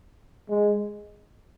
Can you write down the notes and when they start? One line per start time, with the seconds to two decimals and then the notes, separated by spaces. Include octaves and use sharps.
0.49 G#3